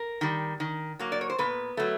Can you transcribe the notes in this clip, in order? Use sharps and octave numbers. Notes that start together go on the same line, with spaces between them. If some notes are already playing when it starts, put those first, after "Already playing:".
Already playing: A#4
D#3 G3
D#3
F#3 A#3
D5
C#5
C5
A#2 B3 B4
F#3 A3